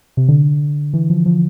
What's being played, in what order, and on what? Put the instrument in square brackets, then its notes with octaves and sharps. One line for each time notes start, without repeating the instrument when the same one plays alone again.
[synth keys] C3
D3
E3
F3
F3